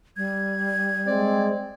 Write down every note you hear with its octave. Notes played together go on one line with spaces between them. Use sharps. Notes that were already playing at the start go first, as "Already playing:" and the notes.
G3 G#6
G#3 C4 D5